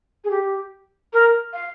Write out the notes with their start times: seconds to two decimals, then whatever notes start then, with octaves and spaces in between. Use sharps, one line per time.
0.24 G#4
0.30 G4
1.13 A#4
1.53 F5